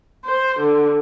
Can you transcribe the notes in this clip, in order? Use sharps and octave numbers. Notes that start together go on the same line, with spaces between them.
C5
D3